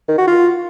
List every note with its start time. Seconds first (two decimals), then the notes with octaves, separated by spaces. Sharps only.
0.08 D#3
0.18 F#4
0.27 F4